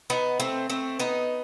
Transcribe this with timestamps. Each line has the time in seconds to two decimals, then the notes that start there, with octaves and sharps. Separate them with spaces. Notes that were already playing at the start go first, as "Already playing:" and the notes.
0.10 B3 D#4
0.40 A3 C4
0.70 A3 C4
0.99 B3 D#4